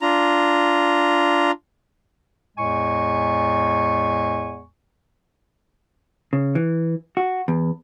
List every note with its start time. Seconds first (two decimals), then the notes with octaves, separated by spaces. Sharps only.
0.02 D4 F4 A#5
2.57 E2 A2 G#3 G#5 C#6
6.33 C#3
6.55 E3
7.17 F#4
7.48 E2